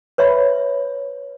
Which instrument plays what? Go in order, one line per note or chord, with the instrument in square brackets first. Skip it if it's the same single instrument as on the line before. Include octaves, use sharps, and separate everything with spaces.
[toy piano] B4 C#5 E5 B5